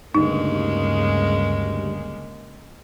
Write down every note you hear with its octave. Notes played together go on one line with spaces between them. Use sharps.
D2 G2 C#3 G#3 A#3 D#4